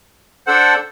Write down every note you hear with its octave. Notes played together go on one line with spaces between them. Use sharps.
D4 A4 C5 F#5